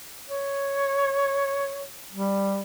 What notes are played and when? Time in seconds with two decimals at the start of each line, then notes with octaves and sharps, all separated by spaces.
0.30 C#5
2.13 G3